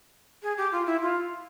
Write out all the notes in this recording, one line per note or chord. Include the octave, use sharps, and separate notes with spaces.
G#4
G4
F4
E4
F4